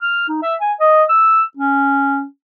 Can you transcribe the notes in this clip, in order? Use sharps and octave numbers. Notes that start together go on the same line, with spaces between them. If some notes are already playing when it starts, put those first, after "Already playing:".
F6
D#4
E5
G#5
D#5
E6
C#4